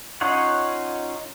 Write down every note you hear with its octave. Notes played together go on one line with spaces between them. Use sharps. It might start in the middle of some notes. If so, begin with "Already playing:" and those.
C#4 D#4 F4 C#5 F#5